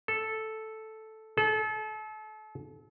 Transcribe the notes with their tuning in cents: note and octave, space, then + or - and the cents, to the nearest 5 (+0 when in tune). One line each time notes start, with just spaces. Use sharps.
A4 -5
A4 -35